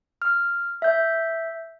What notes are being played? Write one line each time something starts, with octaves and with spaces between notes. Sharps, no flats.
F6
E5 G6